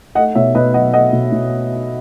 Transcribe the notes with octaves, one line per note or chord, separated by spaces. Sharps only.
A3 D#5 F#5
B2 C#5 E5
B2 B4 D#5
F#3 D#5 F#5
A3 D#5 F#5
B2
B2